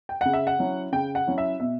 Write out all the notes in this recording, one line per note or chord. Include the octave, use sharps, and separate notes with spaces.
G5
C#3 F#5
E5
F#5
F#3 C#4 E4
C#3 G5
F#5
F#3 C#4 E4
E5
B2 E5